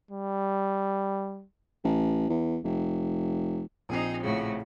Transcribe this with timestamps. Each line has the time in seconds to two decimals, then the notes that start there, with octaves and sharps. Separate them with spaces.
0.11 G3
1.84 A1
2.29 E2
2.64 F1
3.89 A#1 C4 D#4 G#4 C7
4.23 A2 C#3 F#4